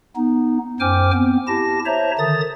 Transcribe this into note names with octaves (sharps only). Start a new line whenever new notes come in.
B3 D#4
F#2 C5 G5 G#5 D6 F6
B3 C4
E4 G4 A5 A#6
C5 C#5 E5 A5 A#5
D3 D#3 D#6 A6